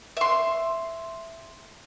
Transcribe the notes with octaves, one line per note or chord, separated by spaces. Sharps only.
E5 C6